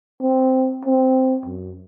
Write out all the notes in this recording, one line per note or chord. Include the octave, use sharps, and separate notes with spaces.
C4
C4
F#2